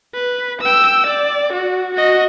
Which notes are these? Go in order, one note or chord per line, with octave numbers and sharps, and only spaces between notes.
B4
G5 E6
D5
F#4
F#4 D#5